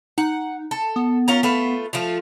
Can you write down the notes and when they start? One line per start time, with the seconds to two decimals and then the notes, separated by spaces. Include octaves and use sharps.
0.18 D#4 F#5
0.71 A4
0.96 B3
1.28 C#4 F4 A#4
1.43 A3 F4 B4
1.93 F3 A3 F4